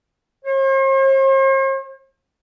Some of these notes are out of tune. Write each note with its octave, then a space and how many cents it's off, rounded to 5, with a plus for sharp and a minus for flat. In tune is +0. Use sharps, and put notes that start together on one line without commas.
C5 +45